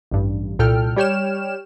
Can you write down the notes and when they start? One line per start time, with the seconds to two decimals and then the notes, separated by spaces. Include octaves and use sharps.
0.11 A1 G2
0.59 C2 A#2 A4 G5 F6
0.96 G3 G4 C#5 G5 F6 E7